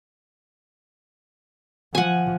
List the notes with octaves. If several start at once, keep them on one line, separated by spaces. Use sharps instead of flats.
F3 F#5 G#5